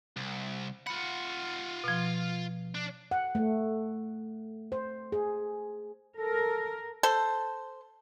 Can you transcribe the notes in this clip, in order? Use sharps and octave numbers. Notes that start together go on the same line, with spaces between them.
C2
F4 F#5 B5
B2 F3
D4
F#5
A3
C5
G#4
A4 A#4
A4 C5